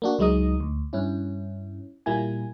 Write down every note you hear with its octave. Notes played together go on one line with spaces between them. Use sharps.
A#3 D4 F#4
C#2 F#3 G#3 D#4 D#5 D#6
D2
G2 C#4 E4
A#2 G3 A#3 E4 G#5